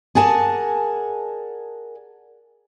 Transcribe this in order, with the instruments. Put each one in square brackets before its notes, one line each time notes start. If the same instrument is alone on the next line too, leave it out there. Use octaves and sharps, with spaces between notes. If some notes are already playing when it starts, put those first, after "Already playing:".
[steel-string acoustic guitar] G#4 A#4 D5 F#5 G#5 A5